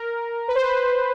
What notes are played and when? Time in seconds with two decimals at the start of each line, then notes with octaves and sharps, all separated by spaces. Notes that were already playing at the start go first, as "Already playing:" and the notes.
Already playing: A#4
0.48 B4
0.55 C5
0.62 B4